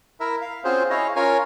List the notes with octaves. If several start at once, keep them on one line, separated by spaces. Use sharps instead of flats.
E4 A#4 E5
F5
C4 C#4 F4 F#4 G#4 C5
E4 G#4 C#5 D#5 F5
C#4 F4 A#4 C#5 G#5